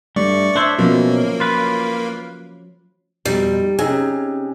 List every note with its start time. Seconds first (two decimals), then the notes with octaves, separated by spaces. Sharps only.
0.16 G2 A3 D5 C#6
0.56 D4 C5 C#5 E5
0.79 B2 F3 F#3 A#3 C#4
1.40 F4 B4
3.25 F2 B2 G3 D#4
3.79 C3 C#4 D#4 G#4